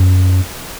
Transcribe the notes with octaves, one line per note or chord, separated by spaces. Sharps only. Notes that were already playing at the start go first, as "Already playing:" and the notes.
Already playing: F#2